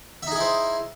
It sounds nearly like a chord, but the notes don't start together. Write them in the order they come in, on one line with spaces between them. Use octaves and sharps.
E5 D#4 G#4 E4 C5